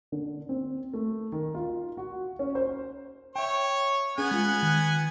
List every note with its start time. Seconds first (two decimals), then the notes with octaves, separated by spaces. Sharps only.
0.12 D3
0.49 C4
0.94 A3
1.32 D#3
1.55 F4
1.97 F#4
2.39 C#4
2.55 C5
3.36 C#5 E5 G5
4.18 B3 C#4 G#4 F#5 G#5
4.31 G#3 F4
4.62 D#3